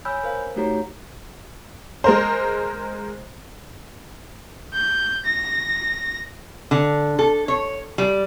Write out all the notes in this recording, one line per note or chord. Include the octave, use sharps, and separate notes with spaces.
C#5 G#5 B5 E6 F6 G6
A#4 C5 F5
A3 D#4 F#4 G4 C#5 A#5
G#3 A#4 C5
G6
A#6
D3
A4
C#5
G3